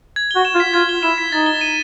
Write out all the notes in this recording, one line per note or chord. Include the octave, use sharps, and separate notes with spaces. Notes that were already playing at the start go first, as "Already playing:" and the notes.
G#6
G7
F#4
E7
F4
B6
F4 G#6
G7
E4 E7
B6
D#4 A6
G7
D#7